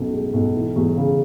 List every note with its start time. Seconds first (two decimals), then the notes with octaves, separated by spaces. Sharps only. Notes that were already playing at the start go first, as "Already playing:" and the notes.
Already playing: B1 F#2 B2
0.12 G#3
0.34 B1
0.55 E3
0.76 E2
0.97 C#3